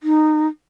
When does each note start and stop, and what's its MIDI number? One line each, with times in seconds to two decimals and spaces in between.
0.03 0.47 63